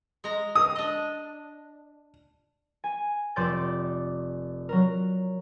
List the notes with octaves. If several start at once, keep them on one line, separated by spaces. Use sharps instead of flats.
G#3 A#5
D#6
D4 D#5
G#5
F1 D5 C6 D6 G6 A6
F#3 A#4